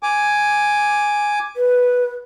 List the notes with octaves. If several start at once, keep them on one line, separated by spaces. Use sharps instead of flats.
G#5 D6
B4